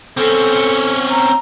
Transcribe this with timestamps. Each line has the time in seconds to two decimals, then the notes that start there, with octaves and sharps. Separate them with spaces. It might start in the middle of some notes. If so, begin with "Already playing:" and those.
0.17 C4 C#4 A4
1.10 A#5